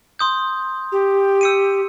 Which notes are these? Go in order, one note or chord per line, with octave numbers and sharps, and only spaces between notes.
C6 D#6 G6
G4
E6 C#7 D#7